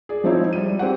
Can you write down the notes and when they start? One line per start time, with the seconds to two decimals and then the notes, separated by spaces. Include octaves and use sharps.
0.09 G#4 D5
0.24 F3 C4 D#4 E4 C#5
0.53 G3 D#7
0.79 C4 G4 F#5